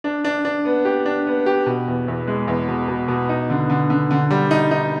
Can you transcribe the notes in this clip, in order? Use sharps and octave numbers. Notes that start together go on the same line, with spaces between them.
D4
D4
D4
B3
G4
D4
B3
G4
B2
E2
E2
G#3
E2
B2
B2
B2
D#4
D3
D3
D3
D3
G3
D#4
D#4